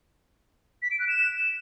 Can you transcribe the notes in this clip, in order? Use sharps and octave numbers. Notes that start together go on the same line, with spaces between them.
B6
D7
F#6
E7